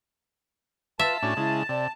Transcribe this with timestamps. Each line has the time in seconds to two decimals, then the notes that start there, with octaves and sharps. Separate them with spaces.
0.99 F4 B4 E5 A5
1.23 A2 C#4 D4 F#4
1.37 C#3 G#3 E4
1.69 C3 D5